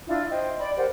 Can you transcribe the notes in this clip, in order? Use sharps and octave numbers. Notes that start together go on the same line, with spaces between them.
D4 E4 F4
C5 D#5 G5
D5 B5
G4 A#4 C5 F#5